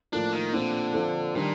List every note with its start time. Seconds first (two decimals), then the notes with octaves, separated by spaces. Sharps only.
0.13 A2 F3 A#3 D4 F4 A4
0.33 D#3
0.53 A#2 D3 F3 C4
0.94 F3 C4 F4 A4
1.35 A#2 D#3 G3 D4